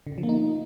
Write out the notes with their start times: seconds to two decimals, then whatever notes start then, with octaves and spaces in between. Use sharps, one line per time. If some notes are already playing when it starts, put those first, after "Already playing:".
0.07 D3
0.12 C#3
0.18 F3
0.23 A#3
0.29 D#4